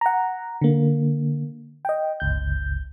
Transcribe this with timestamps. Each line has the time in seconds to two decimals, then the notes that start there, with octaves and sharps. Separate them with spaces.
0.01 F#5 A#5
0.61 D3 A#3
1.85 D#5 G5
2.20 G1 C#2 G6